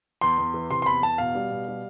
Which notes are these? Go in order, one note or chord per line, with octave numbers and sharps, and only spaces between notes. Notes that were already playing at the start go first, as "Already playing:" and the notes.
E2 C6
E2
E3
C3 C6
C6
E2 B5
E2 A5
B2 F5
G3
B2
G3